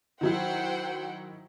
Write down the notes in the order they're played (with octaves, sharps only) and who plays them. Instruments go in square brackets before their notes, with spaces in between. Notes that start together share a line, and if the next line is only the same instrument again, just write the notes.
[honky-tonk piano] D#3 F#3 E4 [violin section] C5 F#5 G5